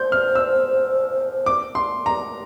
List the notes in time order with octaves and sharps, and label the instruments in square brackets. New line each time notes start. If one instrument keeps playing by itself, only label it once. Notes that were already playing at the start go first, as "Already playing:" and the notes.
Already playing: [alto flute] C5 [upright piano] C6 G6
[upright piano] F6
E6
D6
C6
A#5